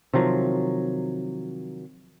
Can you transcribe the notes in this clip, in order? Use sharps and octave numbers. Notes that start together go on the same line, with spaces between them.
C3 D#3 F3 F#3